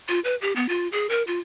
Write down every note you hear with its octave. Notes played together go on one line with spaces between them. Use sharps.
F4
B4
G4
B3
F4
G#4
A#4
F4